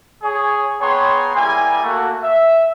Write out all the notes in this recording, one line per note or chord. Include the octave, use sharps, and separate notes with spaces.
G#4 C#5
B3 G#4 C#5 G5 A#5 C6
G3 A#3 E4 G#4 G#5
A3 A#3 F#4
E5